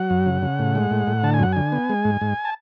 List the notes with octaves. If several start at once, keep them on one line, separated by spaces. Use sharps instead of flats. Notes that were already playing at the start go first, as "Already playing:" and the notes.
Already playing: F#3 F#5
F#2
C#3
C#3
A2
G#3
A2
A2
D3 A5
G#5
F#2 F#5
D3 G#5
B3
G#3
G#2
G#2
A5